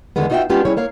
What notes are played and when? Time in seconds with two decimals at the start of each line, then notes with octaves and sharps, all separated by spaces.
0.16 E2 D3 D#3 G#3 B3
0.30 D#4 F4 F#4 D#5 E5 G5
0.50 G#3 B3 C#4 D4 F4 G4
0.65 G3 C#4 E4 G#4 C#5
0.77 A#3 C#5 F5